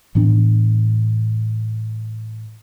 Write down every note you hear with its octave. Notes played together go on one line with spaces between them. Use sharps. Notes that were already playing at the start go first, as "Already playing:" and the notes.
A2 E3 B3 D4